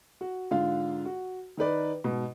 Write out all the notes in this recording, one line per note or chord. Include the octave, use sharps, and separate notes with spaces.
F#4
G#2 D3 F4 F5
F#4
D#3 D#4 B4 D5
G#2 B2